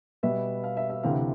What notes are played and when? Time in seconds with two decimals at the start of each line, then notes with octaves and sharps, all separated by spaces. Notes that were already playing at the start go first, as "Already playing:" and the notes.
0.23 B2 G3 B3 E5
0.64 F5
0.77 E5
0.90 E5
1.03 D2 C3 E3 F5